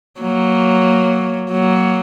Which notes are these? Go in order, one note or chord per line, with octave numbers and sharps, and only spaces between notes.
F#3 A#3
F#3 A#3